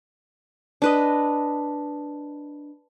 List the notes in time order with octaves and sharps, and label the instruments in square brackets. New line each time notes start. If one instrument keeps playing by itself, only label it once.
[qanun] D4 B4 D#5